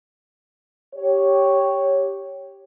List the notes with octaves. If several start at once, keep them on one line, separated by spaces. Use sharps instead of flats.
G4 C#5